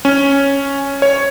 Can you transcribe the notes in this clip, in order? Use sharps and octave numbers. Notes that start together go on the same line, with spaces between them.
C#4
C#5